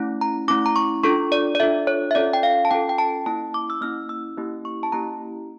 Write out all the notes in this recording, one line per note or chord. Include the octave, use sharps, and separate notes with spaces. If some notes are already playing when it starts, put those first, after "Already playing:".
Already playing: A3 C#4 E4
A#5
A3 C#4 E4 D6
A#5
C#6
D4 F4 A4 C#6
D5
D5
D4 F4 A4 E5
C#5
E5
C#4 F4 A4 D5
G5
F5
A5
C#4 F4 A4 G5
G5
A5
A#3 C#4 E4 A5
D6
E6
A#3 C#4 E4 F6
E6
A#3 C#4 E4 G4
C#6
A5
A#3 C#4 E4 G4 A#5